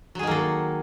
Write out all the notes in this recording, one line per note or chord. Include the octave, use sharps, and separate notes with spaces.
D#3 F#3 A#3 G#4 A4